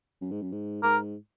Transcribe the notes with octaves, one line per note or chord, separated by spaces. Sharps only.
F#2
G#2
F#2
G#2
G#2 A#4